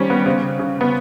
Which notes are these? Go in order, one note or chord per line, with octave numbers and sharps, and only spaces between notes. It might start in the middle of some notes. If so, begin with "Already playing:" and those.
Already playing: D#3 G3 C4 C#4
B3
C#3 C4
C#3
B3